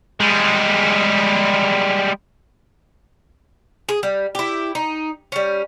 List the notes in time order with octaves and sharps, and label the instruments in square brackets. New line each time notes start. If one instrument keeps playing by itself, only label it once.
[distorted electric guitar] G3 G#3
[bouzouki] G#4
G3
E4 G4
D#4
G3 C#4